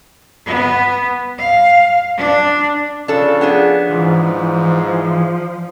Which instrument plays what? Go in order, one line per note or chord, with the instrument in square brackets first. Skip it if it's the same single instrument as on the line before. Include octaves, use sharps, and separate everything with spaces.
[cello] B3
F5
D4
[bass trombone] C#3 [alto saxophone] F3 [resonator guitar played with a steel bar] D4 A4
[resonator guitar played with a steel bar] B3 D4 G#4
[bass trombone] G#2 [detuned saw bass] E3 [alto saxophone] F3